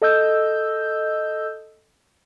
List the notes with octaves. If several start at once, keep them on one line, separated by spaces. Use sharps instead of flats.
A4 D#5 E6 G6